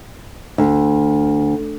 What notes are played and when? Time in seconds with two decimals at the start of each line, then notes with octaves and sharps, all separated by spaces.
0.58 D2